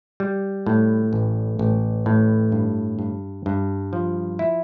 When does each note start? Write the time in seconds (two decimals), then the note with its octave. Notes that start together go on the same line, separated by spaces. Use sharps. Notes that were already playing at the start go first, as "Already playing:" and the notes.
0.20 G3
0.66 A2
1.13 A1
1.59 A1
2.06 A2
2.52 G2
2.99 G2
3.46 G2
3.93 F3
4.39 E4